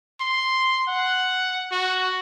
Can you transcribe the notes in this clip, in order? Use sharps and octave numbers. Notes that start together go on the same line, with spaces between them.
C6
F#5
F#4